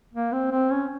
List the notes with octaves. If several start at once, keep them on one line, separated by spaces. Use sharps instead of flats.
A#3
C4
C4
C#4